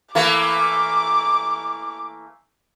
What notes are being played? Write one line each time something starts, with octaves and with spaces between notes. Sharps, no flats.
E3 A3 A#3 D6